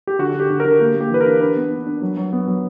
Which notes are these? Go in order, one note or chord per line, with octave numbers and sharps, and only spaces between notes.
G4
D3 F#4
D3
G4
D3
A#4
D3
A#3 G4
A#3
G4
E3 B4
A#4
D4
D4 B4
B3
D4
D4
F#3
F#3
B3
F#3